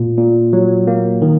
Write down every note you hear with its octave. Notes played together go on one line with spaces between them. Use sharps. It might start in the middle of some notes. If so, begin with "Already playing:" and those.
Already playing: A#2
A#2
F#3
A#3
D#3